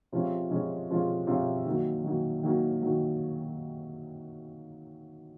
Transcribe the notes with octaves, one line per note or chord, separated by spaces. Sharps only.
C3 F3 G#3 C#4 F4
C3 F3 G#3 C#4 F4
C3 F3 G#3 C#4 F4
C3 F3 G#3 C#4 F4
D#3 F#3 A#3
D#3 F#3 A#3
D#3 F#3 A#3
D#3 F#3 A#3